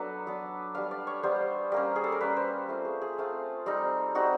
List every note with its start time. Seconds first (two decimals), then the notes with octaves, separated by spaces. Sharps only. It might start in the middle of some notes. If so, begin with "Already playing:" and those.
Already playing: F#3 B3 D4 A4 B4
0.26 F#3 B3 D4
0.75 G3 B3 D4 F5
0.91 D5
1.07 C#5
1.23 G3 B3 D4 C5
1.72 G3 A#3 C#4
1.96 G#4
2.04 A4
2.12 A#4
2.21 G3 A#3 C#4 B4
2.37 C5
2.69 A3 C4 F4
2.85 G#4
3.02 G#4
3.18 A3 C4 F4
3.66 G3 C4 D#4
4.15 G3 C4 D#4 F#4